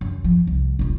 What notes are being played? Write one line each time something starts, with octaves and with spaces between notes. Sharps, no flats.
F#2
F3
C2
D#1 F4